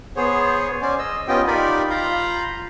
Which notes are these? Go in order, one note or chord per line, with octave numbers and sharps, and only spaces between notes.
B3 G#4 C5 C#5
C#4 C5 D5 G#5
D#5 E6
B3 C#4 F4 G4 D#5 G5
D#4 F4 G4 A#4 D5 B5
F4 F5 A#5 B5 G6